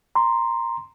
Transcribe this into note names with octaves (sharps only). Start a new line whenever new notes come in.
A#5 C6